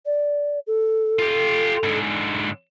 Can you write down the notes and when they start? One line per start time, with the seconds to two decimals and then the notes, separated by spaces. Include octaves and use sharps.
0.06 D5
0.67 A4
1.19 F4 G4
1.84 G#2 D3